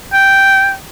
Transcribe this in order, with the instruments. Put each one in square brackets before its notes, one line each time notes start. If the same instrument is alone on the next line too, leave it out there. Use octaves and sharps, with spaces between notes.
[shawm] G5